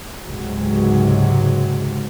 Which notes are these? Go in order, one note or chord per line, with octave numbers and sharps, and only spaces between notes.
C#2 G#2 C3 F#3